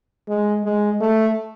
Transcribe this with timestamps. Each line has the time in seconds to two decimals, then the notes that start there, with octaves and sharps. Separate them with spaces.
0.28 G#3
0.65 G#3
1.01 A3